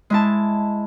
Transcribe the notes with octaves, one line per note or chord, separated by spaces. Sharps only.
G#3 E4 A5